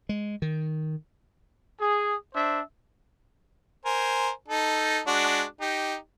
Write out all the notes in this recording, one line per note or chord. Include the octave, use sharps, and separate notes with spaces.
G#3
D#3
G#4
D4 C5 E5
A#4 C5 G#5
D#4 A4
G#3 D4 F#4
D#4 G4